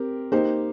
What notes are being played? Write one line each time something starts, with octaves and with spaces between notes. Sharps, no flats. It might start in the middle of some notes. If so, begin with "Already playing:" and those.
Already playing: C4 G4 A#4
A#3 D#4 G4 C5